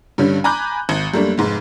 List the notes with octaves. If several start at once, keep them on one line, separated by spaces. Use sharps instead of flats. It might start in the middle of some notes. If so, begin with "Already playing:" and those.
G2 D3 G3 C#4
G#5 A#5 B5 D6 F#6 G6
G#1
F#2 G3 A3 A#3 D4
F1 G#2